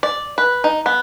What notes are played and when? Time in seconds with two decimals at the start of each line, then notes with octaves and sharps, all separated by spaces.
0.03 D5
0.38 B4
0.64 D#4
0.86 B3